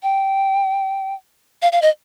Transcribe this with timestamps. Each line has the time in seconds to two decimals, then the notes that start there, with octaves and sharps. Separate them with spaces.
0.03 G5
1.62 F5
1.72 F5
1.82 D#5